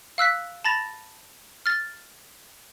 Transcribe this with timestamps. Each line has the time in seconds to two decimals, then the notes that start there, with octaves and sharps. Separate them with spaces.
0.18 F5 E6 F#6 B6
0.64 A5 B5 A6 A#6 F7
1.66 F6 A6